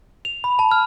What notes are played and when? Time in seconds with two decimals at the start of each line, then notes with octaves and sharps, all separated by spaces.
0.25 F7
0.44 B5
0.59 A5
0.71 F6